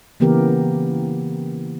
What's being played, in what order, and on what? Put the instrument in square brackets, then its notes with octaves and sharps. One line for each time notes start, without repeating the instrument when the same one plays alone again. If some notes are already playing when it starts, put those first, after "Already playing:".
[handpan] C#3 E3 A#3 B3 G4 A#4